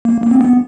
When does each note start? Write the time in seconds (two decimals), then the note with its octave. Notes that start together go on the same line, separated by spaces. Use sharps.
0.05 A#3
0.23 A#3
0.31 C4
0.41 B3